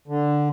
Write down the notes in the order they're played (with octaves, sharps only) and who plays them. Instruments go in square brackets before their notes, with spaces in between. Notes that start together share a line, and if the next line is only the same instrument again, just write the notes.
[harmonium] D3